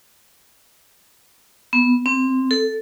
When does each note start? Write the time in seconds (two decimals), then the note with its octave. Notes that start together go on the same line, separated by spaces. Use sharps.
1.73 B3
2.06 C4
2.51 A4